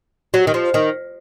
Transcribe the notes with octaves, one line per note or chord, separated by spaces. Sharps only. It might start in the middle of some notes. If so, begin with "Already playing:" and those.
F#3
D#3
F3
D#3